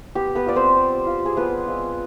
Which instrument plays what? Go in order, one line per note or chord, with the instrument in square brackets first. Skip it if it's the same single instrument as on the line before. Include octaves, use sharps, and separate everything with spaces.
[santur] B3 G4
B3 B4
F4 D5
C4 C5
B3
F4
G#4
F3 B3 B4
G#3 C4 F4